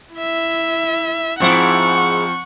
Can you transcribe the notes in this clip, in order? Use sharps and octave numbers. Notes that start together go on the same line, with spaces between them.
E4 E5
G#2 F3 C4 E4 F#5 C#6